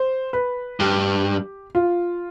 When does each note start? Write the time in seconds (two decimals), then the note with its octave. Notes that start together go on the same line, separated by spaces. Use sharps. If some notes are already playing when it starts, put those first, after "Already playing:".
Already playing: C5
0.33 B4
0.80 G2 G4
1.75 F4